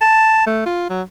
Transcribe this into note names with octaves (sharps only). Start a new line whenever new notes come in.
A5
A3
F4
F#3